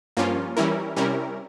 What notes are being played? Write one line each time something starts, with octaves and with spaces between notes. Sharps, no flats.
G2 F3 A#3 C#4 F4
E3 G3 C#4 E4 A#4
C3 G3 C#4 E4 A#4